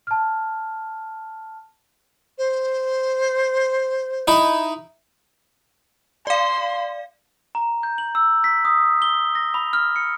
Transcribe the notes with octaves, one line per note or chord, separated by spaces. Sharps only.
A5 F6
C5
D#4 E4
D5 F5 C6
A#5
G6
F#7
E6
B6
D#6
G7
A#6
B5
F6
C#7